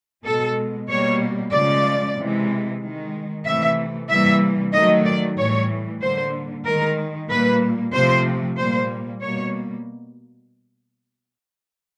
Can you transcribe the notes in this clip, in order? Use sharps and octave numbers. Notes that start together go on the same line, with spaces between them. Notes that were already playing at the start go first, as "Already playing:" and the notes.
B2 G#3 A4
B2 G3 A#3 C#5
C#3 F3 G#3 D5
C3 E3 G#3
D#3 G#3
C3 E3 A3 E5
C3 E3 G3 A#3 E5
D#3 F#3 A3 D#5
D5
A2 E3 G3 C#5
D3 G3 A#3 C5
D#3 G#3 A#4
A#2 G3 A#3 B4
C3 F3 A3 C5
A#2 G3 A#3 C5
B2 G3 A#3 C#5